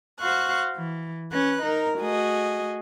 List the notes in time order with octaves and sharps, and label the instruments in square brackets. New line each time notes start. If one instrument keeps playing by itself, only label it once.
[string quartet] F#4 C5 F5 C#6 F#6
E3
C#4 B4 F#6
D#4 A#4
A3 F#4 G#4 D#5